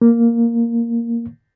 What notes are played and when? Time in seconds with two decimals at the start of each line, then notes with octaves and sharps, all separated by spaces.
0.02 A#3